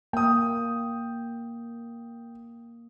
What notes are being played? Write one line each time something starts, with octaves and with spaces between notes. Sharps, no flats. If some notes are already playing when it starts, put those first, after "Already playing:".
A#3 G5 D#6